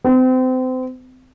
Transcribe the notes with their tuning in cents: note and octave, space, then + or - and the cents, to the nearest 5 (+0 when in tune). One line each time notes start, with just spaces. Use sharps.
C4 -30